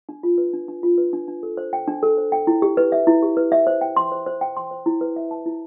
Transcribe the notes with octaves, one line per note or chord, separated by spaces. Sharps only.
D4
F4
B4
D4
D4
F4
B4
D4
D4
A4
C5
G5
D4
A4
C5
G5
E4
G4
B4
E5
E4
G4
B4
E5
C5
G5
C6
C5
C5
G5
C6
C5
E4
B4
E5
A5
E4